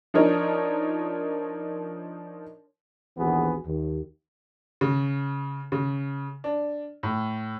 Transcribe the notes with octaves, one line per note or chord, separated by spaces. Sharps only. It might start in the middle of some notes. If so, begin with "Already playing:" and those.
F3 D4 D#4 A#4 C#5
A#1 D#2 E3 B3 F#4 G#4
D#2
C#3
C#3
D4
A2